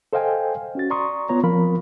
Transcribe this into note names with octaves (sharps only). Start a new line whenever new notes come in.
A4 C5 D#5 F5 G5 G#5
C#4 F#4 A6
D5 A#5 C6 C#6 D#6
B3 F4 C#5 A#5
F3 C4 F4 A#4 F5 B5